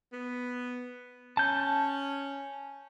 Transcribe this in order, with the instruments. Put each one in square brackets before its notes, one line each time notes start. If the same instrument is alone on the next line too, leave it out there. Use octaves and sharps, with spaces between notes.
[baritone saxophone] B3
[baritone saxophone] C#4 [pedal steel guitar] A5 G6